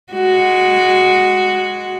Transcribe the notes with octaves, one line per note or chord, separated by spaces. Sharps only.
G#3 F#4